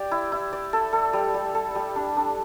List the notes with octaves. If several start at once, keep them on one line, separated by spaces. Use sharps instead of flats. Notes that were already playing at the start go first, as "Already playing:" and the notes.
Already playing: G4 D5
E4
E4
D5
A4
A4
G3
G3
A4
G3
D4
D4